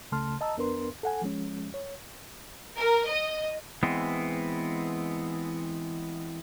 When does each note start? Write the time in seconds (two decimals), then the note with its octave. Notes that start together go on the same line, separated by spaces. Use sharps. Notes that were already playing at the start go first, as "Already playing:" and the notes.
0.12 C#2 C#3 A3 A5 C6 F6
0.41 D#5 A5 A#5 E6
0.57 F2 B3 D4 A#4 B4 C6
1.03 A4 F#5 G#5
1.21 F3 G#3 C#4
1.74 C#5
2.76 A#4
3.08 D#5
3.83 E3 G#3 B3 C4